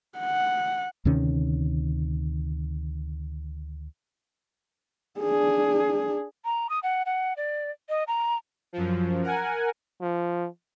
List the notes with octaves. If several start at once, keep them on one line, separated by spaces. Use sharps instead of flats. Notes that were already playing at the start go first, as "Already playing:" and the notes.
F#5
D2 C3 D#3 C#4
D4 G#4
A#5
D#6
F#5
F#5
D5
D#5
A#5
F#2 F3
A#4 F#5 G#5
F3